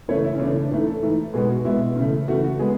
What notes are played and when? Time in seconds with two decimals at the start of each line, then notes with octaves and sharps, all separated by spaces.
0.08 C#3 E3 A3 C#5
0.25 E4
0.35 C#4
0.39 C#3 E3 A3 D4
0.61 D4
0.71 G#2 E3 A3
0.87 A4
1.03 G#2 E3 A3
1.34 B2 G#3 B3 G#4
1.49 F#4
1.65 B2 G#3 B3 E4
1.96 C#3 E3 A3
2.28 C#3 E3 A3 F#4
2.44 F#4
2.59 G#3 B3 G#4